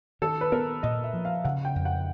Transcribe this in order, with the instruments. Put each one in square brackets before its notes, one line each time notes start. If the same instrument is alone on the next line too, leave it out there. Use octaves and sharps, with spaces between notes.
[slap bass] D#3 [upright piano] A4
[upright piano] B4
[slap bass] B3 [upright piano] A#4
[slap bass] A#2 [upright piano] D#5
[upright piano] E5
[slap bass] F3
[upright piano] F5
[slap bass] C#3 [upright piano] F#5
[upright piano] G5
[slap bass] F2
[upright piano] F#5